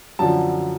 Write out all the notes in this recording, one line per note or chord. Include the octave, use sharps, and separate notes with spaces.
F#2 D3 F3 A5